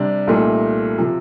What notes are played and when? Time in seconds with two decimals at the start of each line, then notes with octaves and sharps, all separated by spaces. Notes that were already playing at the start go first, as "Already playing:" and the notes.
Already playing: C3 G3 D4
0.27 C2 A#2 A3 D#4
0.99 C3 F3